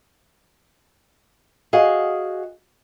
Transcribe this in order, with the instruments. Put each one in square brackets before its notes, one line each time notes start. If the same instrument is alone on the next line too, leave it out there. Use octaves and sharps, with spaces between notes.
[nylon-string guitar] F#4 G#4 D#5 F5